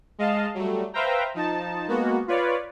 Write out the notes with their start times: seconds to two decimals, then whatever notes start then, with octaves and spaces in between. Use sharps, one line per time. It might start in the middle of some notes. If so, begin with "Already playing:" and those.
0.18 G#3 D#5 F5 A5
0.54 F#3 G3 A3
0.93 B4 C5 E5 F5 G5 A#5
1.34 F3 D#4 A5
1.88 G#3 A#3 B3 F#4
2.28 F4 B4 C#5 D5